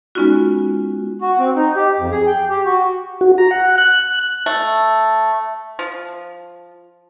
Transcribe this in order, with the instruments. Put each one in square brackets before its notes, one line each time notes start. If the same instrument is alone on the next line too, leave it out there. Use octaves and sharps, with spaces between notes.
[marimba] G#3 B3 C#4 D#4 F4 F#4
[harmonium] F#4
C4
D#4
G4
F2
G#4
G5
G4
F#4
[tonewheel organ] F#4
A#5
F#5
F#6
[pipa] A3
F3